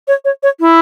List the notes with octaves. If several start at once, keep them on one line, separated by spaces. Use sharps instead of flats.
C#5
C#5
C#5
E4